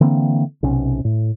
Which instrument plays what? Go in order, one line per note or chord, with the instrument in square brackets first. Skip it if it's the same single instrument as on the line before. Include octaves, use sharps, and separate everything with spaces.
[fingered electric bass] D3 E3 A#3 C4
B1 C3 C#4
A2